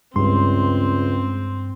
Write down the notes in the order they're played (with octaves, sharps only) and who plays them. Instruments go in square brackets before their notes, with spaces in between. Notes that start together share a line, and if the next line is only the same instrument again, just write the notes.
[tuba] C#2 [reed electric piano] G2 C6 [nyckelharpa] C4